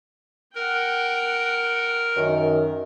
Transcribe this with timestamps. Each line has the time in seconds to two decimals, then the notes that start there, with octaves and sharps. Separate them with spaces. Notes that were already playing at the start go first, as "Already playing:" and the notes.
0.55 A#4 F#5 G5
2.17 F#2 D#3